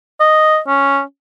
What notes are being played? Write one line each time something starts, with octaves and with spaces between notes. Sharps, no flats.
D#5
C#4